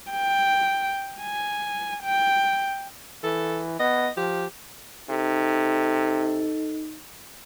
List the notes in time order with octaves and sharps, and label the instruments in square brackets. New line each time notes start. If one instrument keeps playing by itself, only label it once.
[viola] G5
G#5
G5
[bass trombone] E3 [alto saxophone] A4
[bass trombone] B3 [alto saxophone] D#5
[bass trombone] F3 [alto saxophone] G4
[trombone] C3 [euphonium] D#4 [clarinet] A4